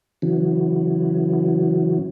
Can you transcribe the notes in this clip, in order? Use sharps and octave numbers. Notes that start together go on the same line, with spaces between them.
C#3 E3 F#3